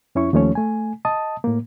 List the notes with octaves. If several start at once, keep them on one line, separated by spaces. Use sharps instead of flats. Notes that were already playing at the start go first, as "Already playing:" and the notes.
F2 C#4 E4 C#6
D#2 F3 A3 C#4 C#5
A3 G#5
D#5 A5 D#6
A2 A#3